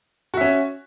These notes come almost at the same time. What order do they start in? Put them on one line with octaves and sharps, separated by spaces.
F#4 E5 C#4